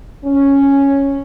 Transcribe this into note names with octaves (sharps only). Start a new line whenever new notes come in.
C#4